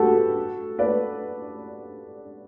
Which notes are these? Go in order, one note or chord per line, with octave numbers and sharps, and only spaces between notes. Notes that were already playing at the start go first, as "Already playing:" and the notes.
Already playing: F#4 G4 A4 B4
B4 D5